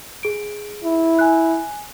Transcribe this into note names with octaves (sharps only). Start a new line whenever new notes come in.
G#4 D7
E4
G#5 F#6